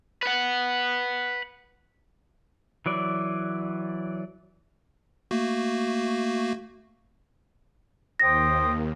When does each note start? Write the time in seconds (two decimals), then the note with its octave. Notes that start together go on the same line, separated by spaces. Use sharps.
0.23 B4 F#5
2.86 E3 F#3 D5
5.31 A3 A#3 F#4
8.20 D#2 C5 G5 D#6 A#6